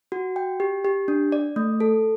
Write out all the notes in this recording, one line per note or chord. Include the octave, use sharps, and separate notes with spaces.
F#4
G5
G4
G4
D4
D5
A3
A4